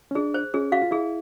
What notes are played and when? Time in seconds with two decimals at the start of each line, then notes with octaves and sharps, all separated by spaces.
0.11 C#4
0.15 D4 G#4
0.34 C5
0.54 C#4 G#4
0.72 F#4 F5
0.82 F4
0.91 E4 G#4